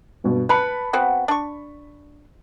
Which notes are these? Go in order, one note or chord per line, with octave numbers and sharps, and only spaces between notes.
G2 B2
B4 A5 B5 C#7
B3 C4 F#4
D4 C#6